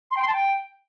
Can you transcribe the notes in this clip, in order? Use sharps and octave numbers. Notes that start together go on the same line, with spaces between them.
C6
G5
C6
A5
G5